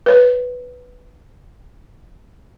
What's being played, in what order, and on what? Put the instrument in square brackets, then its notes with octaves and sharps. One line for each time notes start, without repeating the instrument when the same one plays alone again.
[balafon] B4 C#5